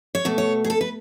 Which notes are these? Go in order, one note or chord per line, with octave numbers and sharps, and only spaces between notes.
C#5
B2 A3
C#5
G#4
A4
B4